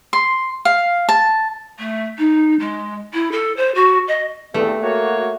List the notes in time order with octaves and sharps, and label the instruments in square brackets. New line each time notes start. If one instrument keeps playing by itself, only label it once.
[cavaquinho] C6
F5
A5
[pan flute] A3
D#4
G#3
E4
A4
C5
F#4
D#5
[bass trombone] E2 [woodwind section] G2 C4 [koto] A3
[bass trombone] A#3 [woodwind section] F#4 C#5